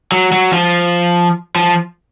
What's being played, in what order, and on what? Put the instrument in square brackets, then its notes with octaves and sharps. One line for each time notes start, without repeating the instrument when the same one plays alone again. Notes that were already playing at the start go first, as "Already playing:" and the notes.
[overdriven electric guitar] F#3
F#3
F3
F3